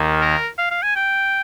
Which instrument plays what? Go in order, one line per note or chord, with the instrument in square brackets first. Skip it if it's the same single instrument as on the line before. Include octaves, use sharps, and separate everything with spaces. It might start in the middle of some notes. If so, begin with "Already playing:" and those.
Already playing: [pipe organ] D#2 D#3 A#3
[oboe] A#4
F5
F5
G#5
G5